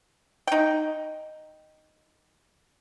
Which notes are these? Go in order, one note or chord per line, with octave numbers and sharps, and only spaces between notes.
D#4 G5